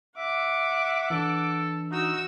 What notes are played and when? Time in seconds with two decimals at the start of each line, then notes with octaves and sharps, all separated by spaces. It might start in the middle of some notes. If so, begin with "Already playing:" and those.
0.17 E5 F#5 D6
1.10 E3 D4 A4
1.91 D#4 F#4 E6